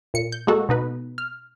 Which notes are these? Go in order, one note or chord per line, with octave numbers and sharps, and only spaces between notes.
A#2 C#7
G6
G#3 A#3 F#4 A4
B2 D#4 B4
F6